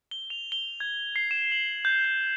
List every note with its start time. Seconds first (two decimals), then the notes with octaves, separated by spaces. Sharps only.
0.11 G7
0.30 F7
0.52 G7
0.80 G#6
1.16 C7
1.31 E7
1.52 F#7
1.85 G6
2.05 G6